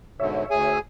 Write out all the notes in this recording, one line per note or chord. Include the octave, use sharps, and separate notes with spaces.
G#2 B2 D3 C#5 E5
D2 G#4 G#5